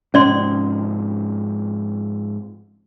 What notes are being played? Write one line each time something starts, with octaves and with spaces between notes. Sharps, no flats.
G#2 C3 F3 C#4 D5 C6